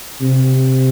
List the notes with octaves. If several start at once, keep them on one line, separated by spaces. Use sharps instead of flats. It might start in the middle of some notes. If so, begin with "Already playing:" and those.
C3